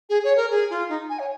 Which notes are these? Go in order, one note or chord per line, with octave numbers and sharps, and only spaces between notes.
G#4
C#5
A#4
G#4
F4
D#4
G#5
C#5